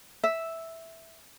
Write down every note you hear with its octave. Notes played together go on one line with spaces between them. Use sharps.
E5